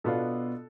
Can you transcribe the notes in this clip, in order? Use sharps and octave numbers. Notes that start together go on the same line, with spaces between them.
B2 B3 D4 F4 A4